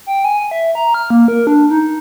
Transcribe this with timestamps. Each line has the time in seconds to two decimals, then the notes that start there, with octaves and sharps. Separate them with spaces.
0.07 G5
0.25 G#5
0.51 E5
0.75 A#5
0.94 F6
1.10 A#3
1.28 A#4
1.47 D4
1.70 D#4